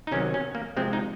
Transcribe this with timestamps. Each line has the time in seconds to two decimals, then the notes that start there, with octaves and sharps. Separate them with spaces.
0.07 D#4
0.11 C3 D#3 F#3 C#4
0.34 C#4
0.55 A#3
0.77 C3 F3 G#3 C4
0.93 D#4